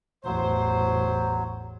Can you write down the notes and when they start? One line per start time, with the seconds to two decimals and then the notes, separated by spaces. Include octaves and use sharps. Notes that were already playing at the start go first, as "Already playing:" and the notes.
0.25 A1 E2 F#3 C5